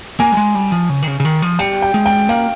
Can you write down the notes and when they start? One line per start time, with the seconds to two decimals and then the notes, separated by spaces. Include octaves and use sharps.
0.20 A#3 G#5
0.32 G3
0.37 G#3
0.55 G3
0.72 F3
0.89 C#3
1.02 D#3
1.07 C#3
1.20 C#3
1.25 D#3
1.42 F3
1.59 G3 G5
1.82 G5
1.94 G#3
2.06 G5
2.29 A#3 F5